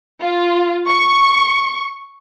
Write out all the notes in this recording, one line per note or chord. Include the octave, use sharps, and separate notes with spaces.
F4
C#6